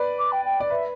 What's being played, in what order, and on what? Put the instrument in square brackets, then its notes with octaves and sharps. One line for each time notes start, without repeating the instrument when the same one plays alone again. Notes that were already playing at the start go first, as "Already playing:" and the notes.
Already playing: [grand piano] B4 D5
[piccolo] D6
G5
G5
[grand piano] D5
[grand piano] B4 [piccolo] E5